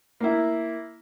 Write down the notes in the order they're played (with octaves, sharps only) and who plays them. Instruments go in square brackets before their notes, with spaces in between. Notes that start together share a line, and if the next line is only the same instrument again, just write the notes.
[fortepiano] A#3 E4